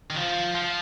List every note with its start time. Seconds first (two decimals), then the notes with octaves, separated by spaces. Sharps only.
0.10 D#3
0.16 F3
0.55 F3